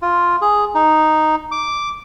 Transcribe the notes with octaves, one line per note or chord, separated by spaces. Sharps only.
F4
G#4
D#4
D6